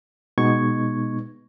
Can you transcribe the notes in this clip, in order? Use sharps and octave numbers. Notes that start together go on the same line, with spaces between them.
B2 G#3 B3 D#4 C#6 G#6